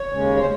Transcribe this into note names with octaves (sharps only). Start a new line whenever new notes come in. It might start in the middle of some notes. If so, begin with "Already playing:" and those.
Already playing: C#5
D#2 C#3 G#3 C#4
C5